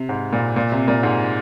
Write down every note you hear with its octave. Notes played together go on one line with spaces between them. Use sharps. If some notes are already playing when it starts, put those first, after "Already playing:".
Already playing: C3
G#2
A#2
A#2
C3
A#2
G#2